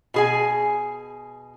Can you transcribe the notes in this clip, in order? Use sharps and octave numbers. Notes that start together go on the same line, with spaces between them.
B2 G#4 G#5